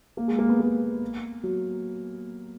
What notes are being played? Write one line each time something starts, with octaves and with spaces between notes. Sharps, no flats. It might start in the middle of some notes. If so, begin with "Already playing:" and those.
A#3
G#3
A#3
B3
A#3
F#3